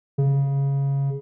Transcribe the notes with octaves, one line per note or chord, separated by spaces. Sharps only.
C#3